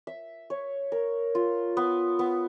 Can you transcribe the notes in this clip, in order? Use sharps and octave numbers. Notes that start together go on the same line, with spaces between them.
E5
C#5
A#4
F4
B3
B3